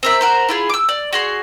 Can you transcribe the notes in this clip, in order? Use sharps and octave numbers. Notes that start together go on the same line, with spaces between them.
C4 A#4 E5
F#4 A#4 C5
E4 F4 G#4
D6 E6
D5
F#4 G#4 C6